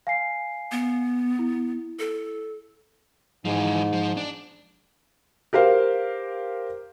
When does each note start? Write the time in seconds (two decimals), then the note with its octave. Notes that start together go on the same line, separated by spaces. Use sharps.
0.07 F5 G#5 C7
0.72 B3
1.39 E4
1.99 A4
3.45 G#2 E3 F3
3.93 F3
4.17 D4
5.53 G4 A#4 C5 F5